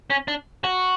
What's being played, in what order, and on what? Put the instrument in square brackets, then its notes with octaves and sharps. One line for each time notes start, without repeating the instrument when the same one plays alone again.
[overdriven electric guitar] C#4
D4
F#4